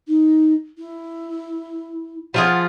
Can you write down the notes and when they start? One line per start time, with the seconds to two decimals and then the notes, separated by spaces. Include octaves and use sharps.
0.08 D#4
0.78 E4
2.34 F3 F4 G#4 F#5